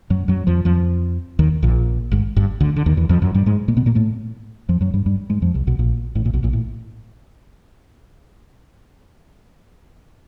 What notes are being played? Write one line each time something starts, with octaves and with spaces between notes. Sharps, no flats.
F#2 F#3
F#2 F#3
F2 F3
F2 F3
D#2 D#3
A#1 A#2
G#1 G#2
G1 G2
D2 D3
D3
D#2 D#3
E2 E3
F2 F3
F#2 F#3
G2 G3
G#2 G#3
A#2 A#3
B2 B3
A#2 A#3
A2 A3
F2 F3
F#2 F#3
G2 G3
G2 G3
G#2 G#3
F2 F3
C2 C3
B1 B2
A#1 A#2
A1 A2
A#1 A#2
B1 B2
A#1 A#2
A2